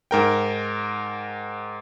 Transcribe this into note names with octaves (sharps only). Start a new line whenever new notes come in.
G#2 A#4 G5